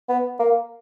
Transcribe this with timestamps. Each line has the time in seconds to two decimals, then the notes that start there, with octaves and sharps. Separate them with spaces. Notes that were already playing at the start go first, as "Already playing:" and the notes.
0.09 B3
0.40 A#3